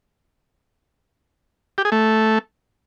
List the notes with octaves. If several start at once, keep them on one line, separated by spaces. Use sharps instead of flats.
G4
G#4
A3